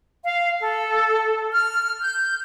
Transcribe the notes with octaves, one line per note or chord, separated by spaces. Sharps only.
F5
A4
F6
G6